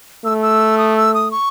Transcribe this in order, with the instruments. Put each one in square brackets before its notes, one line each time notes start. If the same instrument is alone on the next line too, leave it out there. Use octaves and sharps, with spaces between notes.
[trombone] A3 [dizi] E6
[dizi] E6
D#6
E6
D#6
C#6